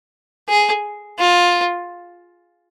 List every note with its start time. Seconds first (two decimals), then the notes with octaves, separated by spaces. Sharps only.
0.49 G#4
1.19 F4